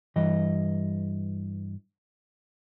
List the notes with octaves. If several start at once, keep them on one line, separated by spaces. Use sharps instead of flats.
G2 E3 D#5